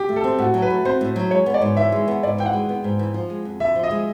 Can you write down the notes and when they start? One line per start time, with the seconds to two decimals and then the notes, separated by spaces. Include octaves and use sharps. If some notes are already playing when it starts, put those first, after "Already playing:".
Already playing: G4
0.09 A3
0.16 A4
0.24 C4
0.39 A2 F#4
0.54 F#3
0.62 B4
0.70 A3
0.85 C4 C5
1.01 A2
1.16 F#3
1.31 G#3 C#5
1.46 B3
1.54 D5
1.62 G#2
1.77 E3 E5
1.92 G#3
2.08 B3
2.23 G#2 D5
2.38 E3 G5
2.46 F#5
2.53 G#3
2.69 B3
2.84 G#2
2.99 E3
3.14 F3
3.30 G#3
3.45 F2
3.60 D3 E5
3.75 F3
3.83 D#5
3.91 G#3